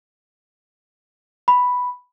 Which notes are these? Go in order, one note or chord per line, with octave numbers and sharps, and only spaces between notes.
B5